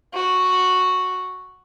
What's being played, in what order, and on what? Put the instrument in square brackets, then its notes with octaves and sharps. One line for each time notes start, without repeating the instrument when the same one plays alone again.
[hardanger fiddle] F#4